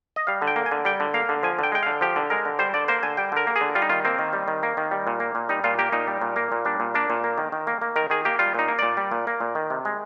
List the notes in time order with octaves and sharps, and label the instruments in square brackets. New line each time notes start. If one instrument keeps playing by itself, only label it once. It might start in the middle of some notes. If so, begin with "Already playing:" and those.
[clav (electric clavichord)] D#5
G3 F5
D3
G5
A#3
G#5
D3
G3 G5
D3
A#3 F5
D3
F3 G#5
D3 G5
G#3 G5
D3 F5
F3 G4
D3
G#3 A#4
D3
G3 C5
D3 D5
A#3 C5
D3 G#5
G3 G5
D3 A#4
A#3
G#4
D3
G3 F4
D#4
D#3 F4
A#3 C4
D#3
G3
D#3
A#3
D#3
G3
A#2
A#3
A#2
G3 D#4
A#2 F4
A#3 G4
A#2 D#4
G3
A#2
A#3
A#2
G3 D4
A#2
A#3 D4
A#2
A#3
D#3
D#3
A#3
A#3
D#3 A#4
D#3 G#4
A#3 G4
G3 F4
A#2 D#4
A#3
A#2 D5
G3
A#2
A#3
A#2
D#3
C3
G#3